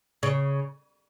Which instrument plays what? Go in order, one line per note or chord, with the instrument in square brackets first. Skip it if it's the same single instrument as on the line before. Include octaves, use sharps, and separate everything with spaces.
[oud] C#3